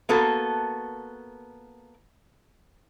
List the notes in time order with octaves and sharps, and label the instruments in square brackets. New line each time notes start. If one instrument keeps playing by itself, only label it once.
[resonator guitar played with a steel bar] A#3 B3 F#4 A4